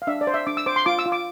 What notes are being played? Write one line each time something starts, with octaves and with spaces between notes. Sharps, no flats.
F5
D4 E5
D5
C5
E5
D4 D6
E6
C5 D6
C6
F4 D6
E6
F4
D6